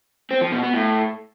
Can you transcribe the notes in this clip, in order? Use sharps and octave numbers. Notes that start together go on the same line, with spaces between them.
C4
F3
B2
B3
A2